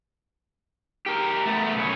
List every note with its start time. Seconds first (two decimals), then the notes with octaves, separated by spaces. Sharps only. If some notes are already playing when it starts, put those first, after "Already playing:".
1.06 G4 A#4
1.46 A3 B3
1.76 B1 C#4